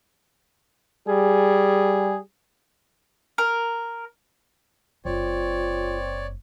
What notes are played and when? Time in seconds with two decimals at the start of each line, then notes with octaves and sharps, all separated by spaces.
1.07 G3 G#4
3.38 A#4
5.05 F#1 C4 F4 C#5 D5